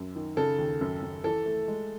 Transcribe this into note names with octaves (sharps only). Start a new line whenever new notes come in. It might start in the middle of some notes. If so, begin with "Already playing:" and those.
Already playing: F#2
D#3
C#3 A4
D#2
F#2
F#2
E3 A4
A3
G#3